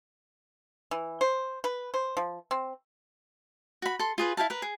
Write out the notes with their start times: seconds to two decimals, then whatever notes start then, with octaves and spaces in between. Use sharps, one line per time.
0.91 E3
1.21 C5
1.64 B4
1.94 C5
2.17 F3
2.51 C4
3.82 F#4 B5
3.99 A4 C6
4.18 F4 G#4 B4
4.37 E4 G#4 F5 A5
4.50 A#4 B4
4.62 G#4